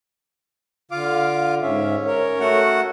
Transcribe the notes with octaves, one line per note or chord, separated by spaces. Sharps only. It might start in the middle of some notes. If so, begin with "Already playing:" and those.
D3 F4 F5 D6
G#2 C#4 E5
A#4 C#5
A3 F#4 F#5